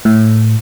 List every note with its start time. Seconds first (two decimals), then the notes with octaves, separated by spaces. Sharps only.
0.05 A2